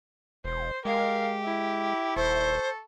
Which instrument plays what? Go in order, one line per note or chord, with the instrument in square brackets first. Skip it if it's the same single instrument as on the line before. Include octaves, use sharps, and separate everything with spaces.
[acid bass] E1 [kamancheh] C5
[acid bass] G#3 [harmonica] G4 [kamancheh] A#4 F5
[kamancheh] E4
[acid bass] D#1 [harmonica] A4 C#6 [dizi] C5